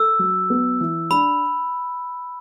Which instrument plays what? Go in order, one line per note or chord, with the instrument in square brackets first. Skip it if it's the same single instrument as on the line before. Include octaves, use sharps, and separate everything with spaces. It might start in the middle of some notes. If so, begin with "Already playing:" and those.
Already playing: [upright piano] A4 [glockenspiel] E6
[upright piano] F#3
B3
E3
[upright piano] D4 [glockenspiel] B5